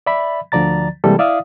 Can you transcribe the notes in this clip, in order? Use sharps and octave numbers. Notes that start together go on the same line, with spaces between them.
D5 E5 B5
D2 D3 F3 D5 A#5 A6
C3 E3 G3 G#3 A#3 A4
E4 D5 E5 F5 D#6